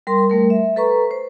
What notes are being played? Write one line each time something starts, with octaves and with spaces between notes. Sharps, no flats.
G3 A#4 C6
G3 A3 A#4
E5
A4 B4 A#5 C#6
C5